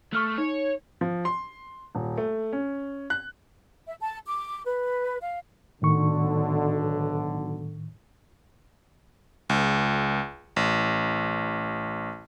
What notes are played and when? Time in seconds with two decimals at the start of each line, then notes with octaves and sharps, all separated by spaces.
0.13 A3 C#6 F6 F#6
0.38 D#4 C#5
1.01 F3
1.25 C6
1.95 D#1
2.18 A3
2.53 C#4
3.10 F#6
3.87 E5
4.01 A5
4.27 D6
4.65 B4
5.20 F5
5.82 B1 A2 D3 D#3 C#6
9.49 C#2
10.56 A1